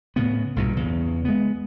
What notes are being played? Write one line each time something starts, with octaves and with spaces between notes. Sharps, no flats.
A2 C#3 B3
B1 G2 A#2
E2 C#3
G#3 B3